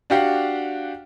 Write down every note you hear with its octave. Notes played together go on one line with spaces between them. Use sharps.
D4 F#4 G4 F5 F#5